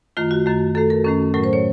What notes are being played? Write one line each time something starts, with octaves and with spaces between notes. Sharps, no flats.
F#2 D#3 A3 F4
F#4
F#2 D#3 A3
F#2 D#3 A3 A4
A#4
F#2 D#3 A3 C#4
A2 F#3 A3 A#4
C5
C#5